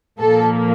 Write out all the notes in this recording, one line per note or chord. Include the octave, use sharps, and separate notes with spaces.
A#2 F3 A#3 A4